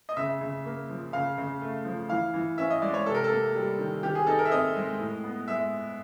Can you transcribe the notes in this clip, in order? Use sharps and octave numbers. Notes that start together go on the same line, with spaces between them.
D#5
C#3 E5
C#3
A#3
F3
C#3 F5
C#3
A3
F3
E3 F5
E3
C#4 E5
D#5
G#3 D5
C#5
C3 A4
A#4
A4
A#3
G3
D#3
D#3 G4
G#4
D#4 A4
A#4
E5
C4 D#5
G#3
A2
B3
G#3 E5